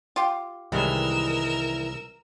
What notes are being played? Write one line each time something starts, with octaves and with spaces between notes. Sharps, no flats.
F4 G4
C2 D#3 E3 G3 G#3 A#4 E6